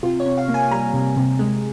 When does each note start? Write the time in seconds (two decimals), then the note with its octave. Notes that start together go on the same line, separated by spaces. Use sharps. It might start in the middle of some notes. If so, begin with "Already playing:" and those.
0.03 C3 F4
0.20 C#5
0.25 C3
0.38 F5
0.48 A#3
0.54 G#5
0.71 G3 A#5
0.94 C3
1.17 C3
1.39 G#3